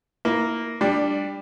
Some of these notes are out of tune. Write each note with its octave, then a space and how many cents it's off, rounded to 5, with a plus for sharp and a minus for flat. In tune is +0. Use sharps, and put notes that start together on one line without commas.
A#3 +0 E4 -25
G3 +15 D4 +0